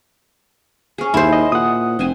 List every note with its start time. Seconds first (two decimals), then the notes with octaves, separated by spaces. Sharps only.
0.98 C#4 G#4
1.14 D#2 E4 C5
1.33 D#5
1.52 A#2 F#5 D#6
1.99 F1 C4 C5 G#5